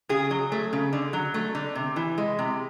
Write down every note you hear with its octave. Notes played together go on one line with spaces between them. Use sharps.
C#3 G#4
F#3
A3
C#3
D3
F#3
A3
D3
C3
E3
G#3
C3